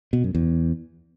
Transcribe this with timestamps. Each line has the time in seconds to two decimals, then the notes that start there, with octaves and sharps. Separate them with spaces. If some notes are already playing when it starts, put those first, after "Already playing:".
0.13 B2
0.24 F#2
0.35 E2